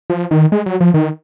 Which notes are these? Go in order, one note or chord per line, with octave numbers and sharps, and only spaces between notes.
F3
D#3
G#3
F#3
F3
D#3